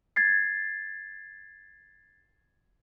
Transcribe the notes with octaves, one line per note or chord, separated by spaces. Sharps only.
G#6 A6 C7